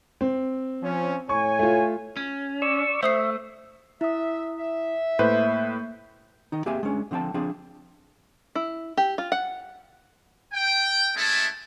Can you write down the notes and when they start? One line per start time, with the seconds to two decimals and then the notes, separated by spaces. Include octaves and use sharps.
0.21 C4
0.83 F3 C#4
1.29 A2 C#5 G#5 C#6
1.59 A3 F4
2.17 C#4
2.62 D5 C#6 E6
3.03 A3 C5 E5 D#6 C7
4.01 E4 E5 D#6
4.58 E5
5.19 A2 A#3 B4 C5 G6
6.52 D#3 D#4
6.66 A#3 C4 G4 G#4 E5 G#5
6.83 G#3 C#4 D4
7.11 D3 F3 C4 G5 A5
7.34 F3 C4 D4 G#4
8.55 E4
8.97 G4
9.18 F4
9.32 F#5
10.53 G5
11.16 G#3 A3 C#4 E4 A5